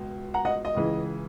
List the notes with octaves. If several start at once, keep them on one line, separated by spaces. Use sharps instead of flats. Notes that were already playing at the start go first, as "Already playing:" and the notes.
Already playing: C#2 B2
F#5 A#5
D#5 F#5
D#5
C#2 C#3 E3